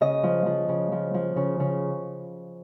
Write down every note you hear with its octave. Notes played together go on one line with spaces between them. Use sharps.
C#3 D#5
F3
F3
C#3
F3
F3
C#3
C#3